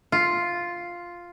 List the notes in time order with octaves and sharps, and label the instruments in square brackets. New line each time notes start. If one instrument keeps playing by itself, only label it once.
[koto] F4